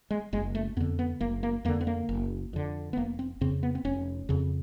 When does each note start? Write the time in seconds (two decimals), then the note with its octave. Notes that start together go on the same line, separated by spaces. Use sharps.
0.11 G#3
0.33 F#1 G#3
0.55 A3
0.77 F2 B3
0.80 D3
0.99 B3
1.21 F#1 A#3
1.43 A#3
1.65 F2 A#3
1.68 D3
1.81 B3
1.87 A#3
2.09 F#1
2.53 F2 D3
2.93 B3
2.97 F1 A#3
3.19 C4
3.41 F2 C#3 C4
3.63 B3
3.75 C4
3.85 F1 C#4
4.29 F2 C#3